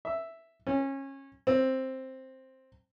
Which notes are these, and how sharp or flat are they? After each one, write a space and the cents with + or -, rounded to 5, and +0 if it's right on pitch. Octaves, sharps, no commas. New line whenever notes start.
E5 +0
C#4 -25
C4 +5